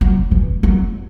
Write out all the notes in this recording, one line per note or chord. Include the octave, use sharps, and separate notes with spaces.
F#3
E3
F#3